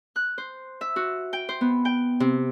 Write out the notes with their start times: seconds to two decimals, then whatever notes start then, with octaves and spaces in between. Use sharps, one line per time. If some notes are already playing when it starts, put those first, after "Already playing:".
0.16 F#6
0.38 C5
0.81 E5
0.96 F#4
1.33 G5
1.49 C5
1.61 B3
1.85 G5
2.20 C3